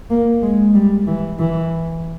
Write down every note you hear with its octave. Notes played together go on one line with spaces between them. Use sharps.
A#3
G#3
G3
E3
E3